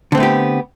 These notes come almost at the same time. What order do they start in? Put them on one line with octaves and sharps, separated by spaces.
D3 C4 A3 B3 G4